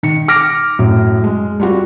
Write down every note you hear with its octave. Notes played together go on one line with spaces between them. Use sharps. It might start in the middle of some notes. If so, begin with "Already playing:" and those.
D#3 C#7
D6 F6 A#6 D7
F#2 A2
G#3
G3 F4 F#4